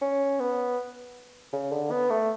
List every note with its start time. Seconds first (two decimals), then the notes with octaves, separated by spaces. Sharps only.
0.02 C#4
0.40 B3
1.53 C#3
1.72 D3
1.91 B3
2.10 A3